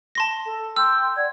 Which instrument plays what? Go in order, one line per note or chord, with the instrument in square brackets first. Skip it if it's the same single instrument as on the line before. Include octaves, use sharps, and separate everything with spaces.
[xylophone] A5 C6 A#6
[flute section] A4
[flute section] G5 C6 G6 [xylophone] E6
[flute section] D5 F#5 G#6